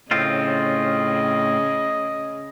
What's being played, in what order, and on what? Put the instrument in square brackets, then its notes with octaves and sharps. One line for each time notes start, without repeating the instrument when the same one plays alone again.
[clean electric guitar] A2 C4 F4 [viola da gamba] C#3 [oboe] D#5